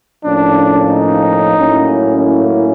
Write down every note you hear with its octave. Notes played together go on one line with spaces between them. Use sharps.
A2 F3 A#3 C#4 D4
D#4
A2 F#3 A#3 C#4 E4